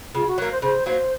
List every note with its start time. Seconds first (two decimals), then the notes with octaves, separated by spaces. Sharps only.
0.15 C#3 F4
0.27 F#4
0.38 F#3 A#3 A#4
0.51 C5
0.62 C#3 C5
0.86 F#3 A#3 C5